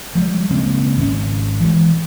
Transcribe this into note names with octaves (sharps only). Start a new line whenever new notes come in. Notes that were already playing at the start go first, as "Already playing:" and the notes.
F3 G3 G#3
C#3 G#3 A#3 C4
G#1 C#4
E3 G#3